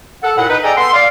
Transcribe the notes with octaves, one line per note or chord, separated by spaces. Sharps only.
A4 F#5
D#2 A#2 E4 F#5
D#4 B4
G#4 A4 D5 D#5 G5 A#5
B3 A4 F#5 C6
D5 F5